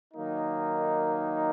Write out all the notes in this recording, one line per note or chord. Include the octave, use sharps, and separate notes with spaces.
D#3 F#3 A#3 D#4